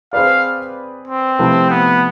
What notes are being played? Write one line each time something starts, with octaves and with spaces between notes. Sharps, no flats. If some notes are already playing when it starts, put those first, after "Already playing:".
C4 G#4 B4 D5 F5
C4
C3 F3 A3 E4 B4
B3